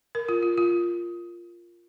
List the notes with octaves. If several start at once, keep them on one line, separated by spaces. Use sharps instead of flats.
A#4
F4
F4
F4